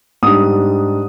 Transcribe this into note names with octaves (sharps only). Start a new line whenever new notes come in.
G#2 G3 D4 D#6